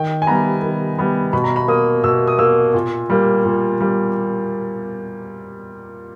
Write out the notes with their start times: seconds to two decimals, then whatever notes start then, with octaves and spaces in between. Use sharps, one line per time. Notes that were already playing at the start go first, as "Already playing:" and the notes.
Already playing: D#3 G5
0.22 G#5
0.27 G3 B3 A#5
0.62 D#3
0.98 G3 B3
1.33 B2 B5
1.44 A#5
1.56 B5
1.68 A#3 D#6
2.04 B2 E6
2.27 D#6
2.39 A#3 E6
2.74 A#2
3.10 G3 A#3
3.45 A#2
3.80 G3 A#3